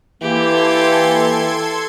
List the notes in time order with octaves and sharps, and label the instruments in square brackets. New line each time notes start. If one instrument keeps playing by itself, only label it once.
[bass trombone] E3 [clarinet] A#3 [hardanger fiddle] G4 [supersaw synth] A4 C6 G#6